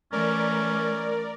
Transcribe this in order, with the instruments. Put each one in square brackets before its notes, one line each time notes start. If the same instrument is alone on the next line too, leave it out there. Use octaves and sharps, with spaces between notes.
[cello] E3 A3 [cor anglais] C#4 [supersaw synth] A#4 D5